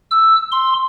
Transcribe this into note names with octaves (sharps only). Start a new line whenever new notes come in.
E6
C6